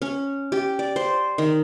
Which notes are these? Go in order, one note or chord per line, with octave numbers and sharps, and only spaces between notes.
C#4
G4
D5
C5
D#3